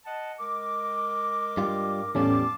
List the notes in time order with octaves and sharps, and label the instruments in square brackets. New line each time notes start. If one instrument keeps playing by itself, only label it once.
[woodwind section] D#5 F#5 A5
G#3 A#4 D6
[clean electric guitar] G2 G3 F4
[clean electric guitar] E2 G3 [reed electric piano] A2 A3 C#4 [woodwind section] F5 A5 D6